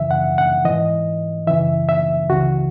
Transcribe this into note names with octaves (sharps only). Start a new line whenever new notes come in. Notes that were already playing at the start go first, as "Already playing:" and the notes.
Already playing: F#2 C#3 E3 E5
F#5
F#5
G#2 E3 D#5
F#2 C#3 E3 E5
E5
C#2 C#3 E3 F#4